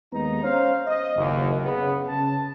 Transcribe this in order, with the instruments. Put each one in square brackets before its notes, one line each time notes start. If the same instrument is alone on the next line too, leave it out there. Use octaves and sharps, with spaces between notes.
[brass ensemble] D#2 G#3 B3 D#4 A#5
C#4 C5 C#5 F5
D#5
F#1 D#2
C#3 B3
C#3 A5